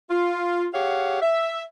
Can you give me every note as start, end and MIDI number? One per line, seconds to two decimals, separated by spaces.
0.10 0.66 65
0.73 1.18 67
0.73 1.18 68
0.73 1.18 73
0.73 1.18 77
0.73 1.18 78
1.22 1.63 76